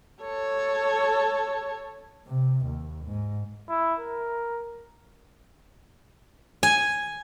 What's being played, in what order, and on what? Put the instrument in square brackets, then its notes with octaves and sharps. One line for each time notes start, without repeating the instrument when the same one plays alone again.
[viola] A4 C#5
[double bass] C3
D#2
G#2
[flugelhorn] E4
A#4
[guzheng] G#5